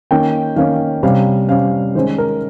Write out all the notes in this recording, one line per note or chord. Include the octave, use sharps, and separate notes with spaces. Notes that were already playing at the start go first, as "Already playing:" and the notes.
D#3 A#3 C#4 G5
D#3 A#3 C#4 F5
C3 G3 C#4 F5
C3 G3 C#4 F5
D#3 G#3 C#4 C5
A#4